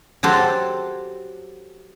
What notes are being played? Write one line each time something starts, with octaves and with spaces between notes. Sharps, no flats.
F#3 G4 A4 C5